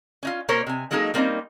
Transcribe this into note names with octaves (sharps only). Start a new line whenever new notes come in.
C#4 D#4 F4
B2 A#3 A#4 C5 C#5
C3 G#5
F#3 G#3 A#3 D#4 G#4 A4
G3 A#3 C4 C#4 D#4